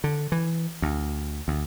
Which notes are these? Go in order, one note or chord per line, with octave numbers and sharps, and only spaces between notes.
D3
E3
D2
D2